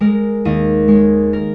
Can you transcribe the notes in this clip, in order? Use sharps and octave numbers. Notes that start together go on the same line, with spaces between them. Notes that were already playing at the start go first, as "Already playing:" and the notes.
G#3 A#4
D#2 D#5
G#3 C#5
A#4